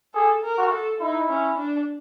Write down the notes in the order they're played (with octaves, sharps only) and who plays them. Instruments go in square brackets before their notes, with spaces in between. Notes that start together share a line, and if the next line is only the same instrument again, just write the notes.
[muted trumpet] G#4 [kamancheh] A4
[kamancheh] A#4
[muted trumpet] F#4
[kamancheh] A4
[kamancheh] D#4 [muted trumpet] E4
[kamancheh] C#4
D4